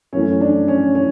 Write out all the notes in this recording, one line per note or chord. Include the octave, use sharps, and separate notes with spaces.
F#2 E3 A3 C#4
D4
C#4
C#4